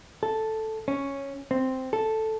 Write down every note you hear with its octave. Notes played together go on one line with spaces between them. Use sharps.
A4
C#4
C4
A4